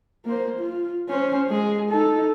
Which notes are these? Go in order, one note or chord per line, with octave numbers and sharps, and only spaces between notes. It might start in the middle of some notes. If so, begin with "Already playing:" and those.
A#3 C5
F4
C#4 C5
G#3 G#4
D#4 A4